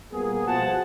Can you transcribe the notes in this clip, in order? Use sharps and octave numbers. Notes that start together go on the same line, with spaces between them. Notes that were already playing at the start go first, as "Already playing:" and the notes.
A#2 G3 A#3 B3 G#4
B2 F3 F#5 A5